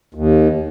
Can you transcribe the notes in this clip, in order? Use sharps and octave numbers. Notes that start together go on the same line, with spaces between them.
D#2